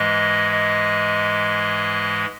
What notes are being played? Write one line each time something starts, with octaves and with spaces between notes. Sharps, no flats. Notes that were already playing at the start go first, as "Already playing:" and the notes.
Already playing: G#2 E3 G#3 D#5
D#5